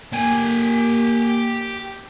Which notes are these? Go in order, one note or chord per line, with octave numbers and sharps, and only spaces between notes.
A#3 G4 G#5